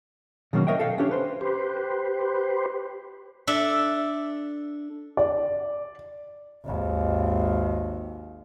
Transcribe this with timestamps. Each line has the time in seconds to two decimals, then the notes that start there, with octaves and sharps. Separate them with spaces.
0.53 B2 D#3 F#3 A#3 C#4 F#4
0.67 A#4 C#5 D#5 E5 F#5 G5
0.79 A4 F5 G5
0.98 C#4 D4 G4 A4 C#5
1.11 B4 C5
1.41 G4 B4 C5
3.47 D4 A4 E5
5.17 D5
6.65 G#1 D#2